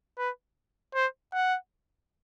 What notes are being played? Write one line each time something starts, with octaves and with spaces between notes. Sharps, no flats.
B4
C5
F#5